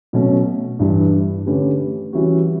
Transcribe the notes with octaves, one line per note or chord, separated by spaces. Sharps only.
B2 F#3 A3 C#4
G2 E3 G3 D4
D3 A3 C#4 G4 B4
E3 G3 C#4 F#4